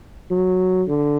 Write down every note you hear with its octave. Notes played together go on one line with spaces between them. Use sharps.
F#3
D3